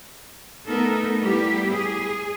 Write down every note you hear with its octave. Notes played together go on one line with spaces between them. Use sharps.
A3 B3 D#4 A4 A#4
G3 B3 E4 G4
G#4